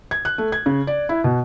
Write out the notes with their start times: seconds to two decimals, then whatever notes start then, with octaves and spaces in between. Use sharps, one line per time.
0.11 G#6
0.25 F#6
0.38 A3
0.52 G#6
0.66 C#3
0.87 D5
1.09 E4
1.24 B2